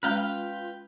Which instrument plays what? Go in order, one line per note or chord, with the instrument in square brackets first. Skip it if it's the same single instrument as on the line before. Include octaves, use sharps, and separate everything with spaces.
[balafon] G#3 C#4 [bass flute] F4 [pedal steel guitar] B4 F5 G5